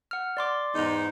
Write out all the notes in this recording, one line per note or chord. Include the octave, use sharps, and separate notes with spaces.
F#5 F6
D5 C6 D6
E2 G#2 D#4